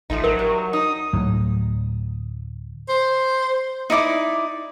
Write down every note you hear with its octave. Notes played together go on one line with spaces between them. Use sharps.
A1 F3 A3 D#4
F#3 A#4
G3
D#4 D#6
D2 A2 F#3
C5
D#4 E4 D5 D6